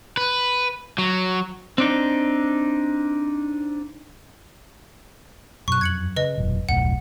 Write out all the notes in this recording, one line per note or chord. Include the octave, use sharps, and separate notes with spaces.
B4
F#3
C4 D4 D#4
F#2 B2 C#6 F#6
F2 G#6 C#7 F#7
C#3 B4 D#5
E1 F#2 A#2
D1 B1 F2 A2 F#5